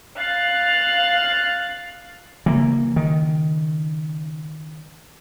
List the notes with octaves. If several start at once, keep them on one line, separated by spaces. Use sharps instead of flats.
F5 F#6 A6
C#3 E3 A#3
D#3